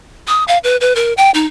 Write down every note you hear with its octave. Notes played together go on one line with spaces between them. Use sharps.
D#6
F5
B4
B4
A#4
G5
D#4